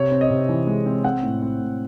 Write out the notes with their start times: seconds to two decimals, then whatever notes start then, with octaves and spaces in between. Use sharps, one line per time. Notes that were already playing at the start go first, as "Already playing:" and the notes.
Already playing: C3 C#5
0.11 C4
0.21 D#5
0.30 C3
0.49 E3
0.67 G#3
0.86 C4
1.04 C4 F#5
1.23 A2
1.42 C4
1.61 A2